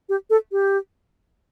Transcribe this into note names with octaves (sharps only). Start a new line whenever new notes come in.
G4
A4
G4